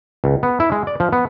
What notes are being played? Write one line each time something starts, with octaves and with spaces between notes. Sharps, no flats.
C#2
B3
E4
G#3
D5
F3
B3